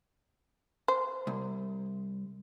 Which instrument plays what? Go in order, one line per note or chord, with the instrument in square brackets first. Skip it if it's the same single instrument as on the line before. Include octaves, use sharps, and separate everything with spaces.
[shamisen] C5
[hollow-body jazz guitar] C2